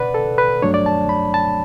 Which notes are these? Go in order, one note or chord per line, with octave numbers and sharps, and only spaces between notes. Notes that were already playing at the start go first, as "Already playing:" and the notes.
Already playing: B2 B4 D5 F#5
A4
B4
G2 F#3 A3 D4 C#5
D5
A5
B5
A5